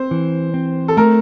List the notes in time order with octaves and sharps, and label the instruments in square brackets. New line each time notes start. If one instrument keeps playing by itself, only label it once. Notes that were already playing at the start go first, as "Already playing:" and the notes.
Already playing: [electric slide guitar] C4 [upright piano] C5
[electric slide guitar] E3
C4
[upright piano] A4
[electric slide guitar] A3 [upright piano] A#4